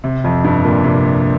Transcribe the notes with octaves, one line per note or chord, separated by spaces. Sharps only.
C3
F2
G2
A#2
C3